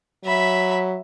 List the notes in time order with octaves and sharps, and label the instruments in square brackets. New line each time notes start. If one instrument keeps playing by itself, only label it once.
[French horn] F#3 [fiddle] E5 B5